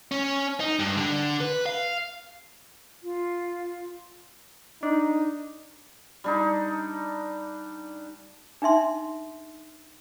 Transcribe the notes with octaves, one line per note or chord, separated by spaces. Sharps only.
C#4
D#4
G2
D3
B4
F5
F4
D4 D#4
G3 D4 D#4
D4 D#4 E5 C6